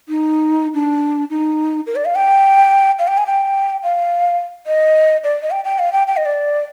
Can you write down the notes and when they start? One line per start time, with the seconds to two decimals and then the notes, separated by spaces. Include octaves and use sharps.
0.09 D#4
0.74 D4
1.30 D#4
1.87 A#4
1.96 D5
2.05 F5
2.15 G5
2.99 F5
3.08 G5
3.18 G#5
3.26 G5
3.83 F5
4.67 D#5
5.24 D5
5.42 D#5
5.51 G5
5.64 G5
5.79 F5
5.93 G5
6.07 G5
6.17 D#5
6.25 D5